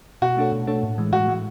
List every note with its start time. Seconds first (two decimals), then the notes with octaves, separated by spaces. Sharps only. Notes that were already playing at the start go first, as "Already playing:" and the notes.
0.22 B2 F#4
0.37 A3 D4 A4 C#5
0.52 B2
0.67 A3 D4 A4 C#5
0.83 A2
0.98 E3 G#3
1.13 A2 F#4
1.28 E3 G#3